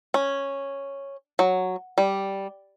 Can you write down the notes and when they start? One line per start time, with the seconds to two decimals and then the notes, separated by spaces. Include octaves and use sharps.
0.14 C#4
1.39 F#3
1.98 G3